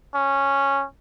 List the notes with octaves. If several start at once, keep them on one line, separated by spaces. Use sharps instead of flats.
C#4